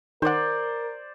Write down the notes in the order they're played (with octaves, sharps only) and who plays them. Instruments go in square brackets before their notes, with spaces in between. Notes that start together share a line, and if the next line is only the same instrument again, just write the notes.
[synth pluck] D#3 F#5 [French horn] A#4 [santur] C5 D5